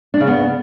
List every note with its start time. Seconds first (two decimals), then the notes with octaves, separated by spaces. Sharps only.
0.14 D4
0.21 C#3
0.27 B3